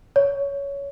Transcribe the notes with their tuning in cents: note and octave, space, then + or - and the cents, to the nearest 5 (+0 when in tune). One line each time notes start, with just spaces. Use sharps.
C#5 +15